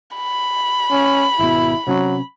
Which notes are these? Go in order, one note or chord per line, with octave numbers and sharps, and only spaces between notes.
B5
C#4
G#1 B2 E4
C3 F#3 C#4